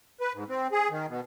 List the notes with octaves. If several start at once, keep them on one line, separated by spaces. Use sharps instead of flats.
B4
G#2
C4
G#4
D#3
B2